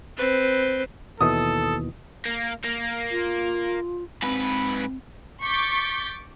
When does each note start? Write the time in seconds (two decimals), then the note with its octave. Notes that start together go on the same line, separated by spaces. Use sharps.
0.17 C4 B4
1.21 D#2 B2 E3 A4 D#6
2.26 A#3
2.65 A#3
3.11 F4
4.22 G#2 C4 B4
5.42 C#6 D6 G6 A6 B6